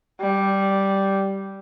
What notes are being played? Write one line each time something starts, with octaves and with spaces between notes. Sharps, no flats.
G3